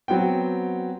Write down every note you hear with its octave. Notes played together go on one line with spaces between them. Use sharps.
F#3 B3 C4 G5